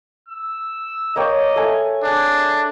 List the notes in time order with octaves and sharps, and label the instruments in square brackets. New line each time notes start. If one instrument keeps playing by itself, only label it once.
[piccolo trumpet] E6
[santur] A#3 C#5 G5 [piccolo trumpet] D#5
[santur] A3 G#5
[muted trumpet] D4 [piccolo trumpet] G#4